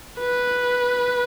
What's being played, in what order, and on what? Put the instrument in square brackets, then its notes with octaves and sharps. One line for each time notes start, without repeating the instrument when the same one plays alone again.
[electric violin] B4